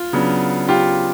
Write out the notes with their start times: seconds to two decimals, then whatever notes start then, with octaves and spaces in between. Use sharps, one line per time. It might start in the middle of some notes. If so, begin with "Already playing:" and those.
Already playing: F4
0.13 C#3 F#3 B3 D4
0.68 F4 G4